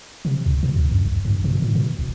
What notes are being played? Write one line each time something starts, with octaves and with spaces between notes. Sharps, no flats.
C3
C#2
B2
D2
F#2
A#1
G2
B2
A2
B2
A1